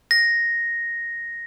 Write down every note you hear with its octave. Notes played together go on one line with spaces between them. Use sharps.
A#6